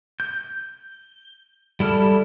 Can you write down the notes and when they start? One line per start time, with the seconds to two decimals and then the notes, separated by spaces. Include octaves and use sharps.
0.20 G6
1.80 G3 E4 A4 F6